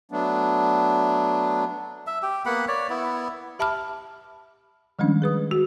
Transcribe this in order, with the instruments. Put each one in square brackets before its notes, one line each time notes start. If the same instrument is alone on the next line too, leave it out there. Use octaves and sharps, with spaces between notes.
[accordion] F#3 A3 B3 D4
[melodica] E5
G4
A#3 B3 F#5 B5
C#5 D5
B3 E4
[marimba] G4 E5 A5 B5 D6 F6
D#3 F3 G3 G#3 C#4 D4
G#4 B4 D#6
F#4